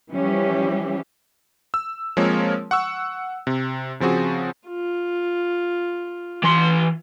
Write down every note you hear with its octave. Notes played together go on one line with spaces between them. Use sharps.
E3 F3 G3 C#4 G4
E6
F3 G#3 A#3 C4 A#4 C#5
F#5 C#6 E6
C3
C#3 F3 C4 F#4 G#4
F4
E3 C6